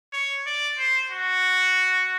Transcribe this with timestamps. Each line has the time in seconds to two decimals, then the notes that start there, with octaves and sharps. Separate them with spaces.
0.13 C#5
0.46 D5
0.78 C5
1.11 F#4